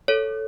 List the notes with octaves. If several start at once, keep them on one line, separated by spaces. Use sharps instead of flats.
A4 C#5